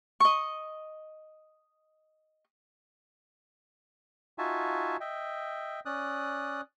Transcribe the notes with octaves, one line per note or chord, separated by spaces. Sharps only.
D#5 C#6
D#4 F4 F#4 E5 G#5 A5
D#5 E5 G5
C#4 D5 D#6 F#6